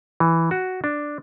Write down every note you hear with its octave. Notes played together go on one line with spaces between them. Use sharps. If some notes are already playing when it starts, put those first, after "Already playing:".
E3
F#4
D4